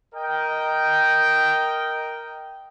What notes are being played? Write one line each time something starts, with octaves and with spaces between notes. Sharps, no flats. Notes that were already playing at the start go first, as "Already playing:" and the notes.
A#4 D#5 G5